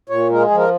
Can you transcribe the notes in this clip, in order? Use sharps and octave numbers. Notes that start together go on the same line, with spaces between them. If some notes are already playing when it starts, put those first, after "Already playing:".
A#2 C#5
G#3 A#4
F4
G#4
F3
A#4